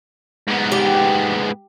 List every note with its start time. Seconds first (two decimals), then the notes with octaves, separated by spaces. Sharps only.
0.48 G#2 B3
0.72 G4